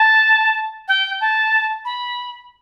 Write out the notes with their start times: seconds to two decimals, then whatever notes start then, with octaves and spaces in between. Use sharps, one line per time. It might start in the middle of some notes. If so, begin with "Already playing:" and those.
Already playing: A5
0.88 G5
1.20 A5
1.85 B5